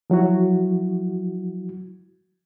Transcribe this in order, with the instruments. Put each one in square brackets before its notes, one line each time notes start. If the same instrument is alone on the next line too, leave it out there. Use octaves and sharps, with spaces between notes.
[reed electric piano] F3 F#3 E4 F#4